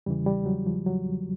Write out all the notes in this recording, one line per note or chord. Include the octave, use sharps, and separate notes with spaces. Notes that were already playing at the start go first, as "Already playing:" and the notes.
E2 C#3 E3 G3
G3
F#3
F3
F#3